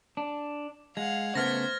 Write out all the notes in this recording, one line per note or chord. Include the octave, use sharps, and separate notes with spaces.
D4
G#3 F5 F#5 G#6
C#3 A3 B3 C5 F6 A6 A#6